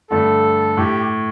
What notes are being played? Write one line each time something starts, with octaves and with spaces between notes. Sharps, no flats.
G2 D3 A3 A4
A2 G4